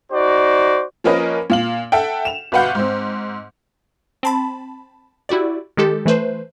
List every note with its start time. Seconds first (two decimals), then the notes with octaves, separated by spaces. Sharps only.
0.12 D#4 F#4 C5 D5
1.04 F3 A#3 C#4 A#4 B4 D#5
1.50 A#2 F5 F#7
1.92 A4 E5 F#5 G5
2.25 E7 F7
2.52 G1 B2 B4 F5 F#5 G6
2.75 G#2 C4
4.23 C4 A5 B5
5.29 E4 F#4 G4 D5
5.77 D#3 G#3 G4 A4
6.06 E3 A3 B4 C5